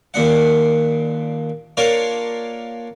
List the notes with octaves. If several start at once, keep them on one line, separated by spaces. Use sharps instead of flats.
D#2 A#2 D4 F#5
A#3 D4 F4 A#4 C#5 D5